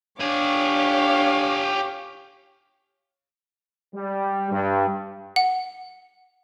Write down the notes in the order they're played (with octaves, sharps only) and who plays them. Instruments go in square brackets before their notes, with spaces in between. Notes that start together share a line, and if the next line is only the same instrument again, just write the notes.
[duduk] D4 [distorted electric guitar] G4 G#5 [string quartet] C#5 F5 D6
[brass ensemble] G3
G2
[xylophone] F#5